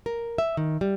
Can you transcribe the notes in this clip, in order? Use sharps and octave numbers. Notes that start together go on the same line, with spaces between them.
A#4
E5
D#3
G3